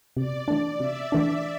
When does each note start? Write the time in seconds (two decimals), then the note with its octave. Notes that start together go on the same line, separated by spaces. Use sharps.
0.16 C3 D5
0.48 E3 A3 D4
0.80 C3 E5
1.12 E3 A3 D4